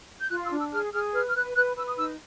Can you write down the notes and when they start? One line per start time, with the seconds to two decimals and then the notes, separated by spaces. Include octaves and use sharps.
0.20 G6
0.30 F4 F#6
0.45 E6
0.51 D4
0.59 E6
0.72 G#4 F6
0.93 G#4 F6
1.14 B4 F6
1.29 F6
1.35 B4 F#6
1.56 B4 F#6
1.76 B4 E6
1.87 D#6
1.97 D#4 E6